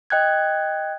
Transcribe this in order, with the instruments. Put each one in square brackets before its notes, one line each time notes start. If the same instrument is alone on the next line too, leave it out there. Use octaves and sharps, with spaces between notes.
[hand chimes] D#5 G5 F#6 G#6